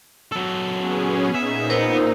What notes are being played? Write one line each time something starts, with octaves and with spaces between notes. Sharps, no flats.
F#3 A4
B3 C#4 G#4
A#2 D#4 E5
B3 A#4 C5 E6